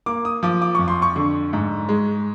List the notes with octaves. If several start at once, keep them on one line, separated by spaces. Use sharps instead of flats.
A#3 D6
D#6
F3 D6
D6
F2 C#6
C6
C#6
D3
G#2
G#3